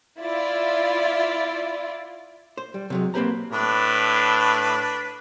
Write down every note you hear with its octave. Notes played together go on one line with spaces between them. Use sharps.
E4 F4 D5
C5
G3
C3 F#3 G#3
A#3 C4 G4 B4 C5 A#5
A2 D4 B4